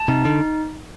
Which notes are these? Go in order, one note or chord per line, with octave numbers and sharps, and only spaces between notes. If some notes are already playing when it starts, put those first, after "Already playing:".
Already playing: A5
C3 D#4
D3 D#4